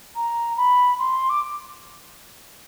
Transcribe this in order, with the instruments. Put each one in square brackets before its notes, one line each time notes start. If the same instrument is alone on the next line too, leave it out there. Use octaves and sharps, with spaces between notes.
[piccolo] A#5
B5
C6
D6